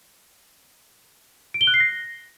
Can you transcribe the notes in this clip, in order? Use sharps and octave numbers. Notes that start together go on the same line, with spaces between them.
D7
G7
F#6
C7
A#6